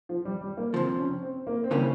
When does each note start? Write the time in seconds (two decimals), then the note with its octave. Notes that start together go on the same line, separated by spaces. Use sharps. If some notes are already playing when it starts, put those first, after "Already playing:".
0.09 F3
0.25 G3
0.41 G3
0.57 A#3
0.74 F2 C3 F3 C4
0.99 C#4
1.23 C4
1.47 A#3
1.64 C4
1.71 C#3 E3 G3 A#3 C#4